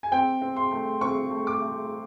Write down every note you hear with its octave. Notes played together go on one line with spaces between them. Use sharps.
G#5
C4 G5
C4
C6
A3
C4 C#6
A3
D6
A3